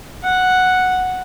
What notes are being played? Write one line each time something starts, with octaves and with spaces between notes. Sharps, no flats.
F#5